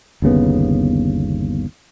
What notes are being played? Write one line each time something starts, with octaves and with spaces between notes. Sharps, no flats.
G1 D#2 C#3 B3